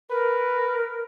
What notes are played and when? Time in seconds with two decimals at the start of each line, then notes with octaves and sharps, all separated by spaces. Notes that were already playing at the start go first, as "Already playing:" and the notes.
0.10 A#4 B4